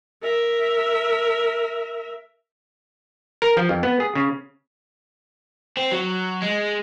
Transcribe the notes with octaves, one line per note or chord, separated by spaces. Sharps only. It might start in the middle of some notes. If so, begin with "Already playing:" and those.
A#4 E5
A#4
F3
F2
B3
G#4
C#3
C4
F#3
G#3